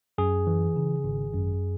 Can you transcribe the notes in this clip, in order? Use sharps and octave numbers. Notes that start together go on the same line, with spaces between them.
F#2 G#4
E3
C#3
G#1
F#2